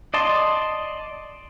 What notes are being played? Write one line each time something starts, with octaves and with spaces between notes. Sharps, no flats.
D5 D#5 A5 C6